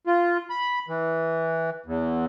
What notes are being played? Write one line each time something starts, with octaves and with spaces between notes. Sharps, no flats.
F4
B5
E3
E2